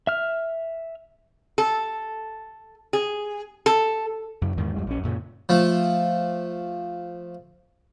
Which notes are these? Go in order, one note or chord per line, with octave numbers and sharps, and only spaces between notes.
E5 F6
A4
G#4
A4
F#2 C#3
E2 G#2 D#3
F2 G3 G#3
A#1 E3 C#4
F#2 A#2 C#3
F3 A3